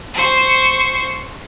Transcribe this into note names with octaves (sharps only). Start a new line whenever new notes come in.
C5 C#6